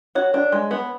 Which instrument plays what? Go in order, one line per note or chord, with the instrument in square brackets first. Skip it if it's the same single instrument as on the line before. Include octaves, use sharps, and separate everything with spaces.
[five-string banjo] F#4 [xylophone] C#5
[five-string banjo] D4
G#3
B3